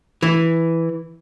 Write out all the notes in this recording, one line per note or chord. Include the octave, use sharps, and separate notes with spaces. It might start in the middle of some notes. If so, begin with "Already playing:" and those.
E3